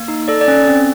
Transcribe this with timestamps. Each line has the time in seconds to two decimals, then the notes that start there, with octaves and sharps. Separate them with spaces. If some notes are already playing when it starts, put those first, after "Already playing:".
Already playing: A#3
0.08 D#4
0.28 A4 D5
0.41 D5
0.48 C#4
0.68 C4